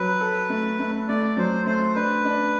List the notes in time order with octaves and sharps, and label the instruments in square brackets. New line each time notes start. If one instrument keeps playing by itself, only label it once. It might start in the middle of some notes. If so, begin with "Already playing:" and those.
Already playing: [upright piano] F#3 [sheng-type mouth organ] B4
[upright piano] A4
A3
A3
[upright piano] A3 [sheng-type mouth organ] D5
[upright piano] F#3 [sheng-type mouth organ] C5
[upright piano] A3 [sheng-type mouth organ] C5
[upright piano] D4 [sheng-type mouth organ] B4
[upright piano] D4